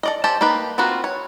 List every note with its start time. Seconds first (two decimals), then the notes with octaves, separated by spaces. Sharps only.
0.03 A4 D5 D#5
0.24 G4 A4 C5 A5
0.41 A#3 D#4 G4 B4
0.78 A#3 C4 F4 F#4 B4
1.04 C#5